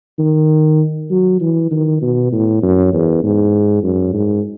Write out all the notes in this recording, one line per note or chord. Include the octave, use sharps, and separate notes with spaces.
D#3
F#3
E3
D#3
B2
A2
F#2
E2
G#2
F#2
G#2